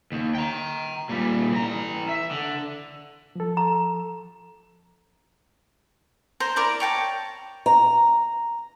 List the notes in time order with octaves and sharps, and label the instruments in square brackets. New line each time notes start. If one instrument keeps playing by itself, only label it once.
[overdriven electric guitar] D#2
G5 A#5
A#2 G3
E3 A#5
E5
D3
[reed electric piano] F3 A4
[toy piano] A#5
[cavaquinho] C5 A#5
E4 A#4 D5 D6
C#5 G5 A5 A#5
[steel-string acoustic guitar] A#5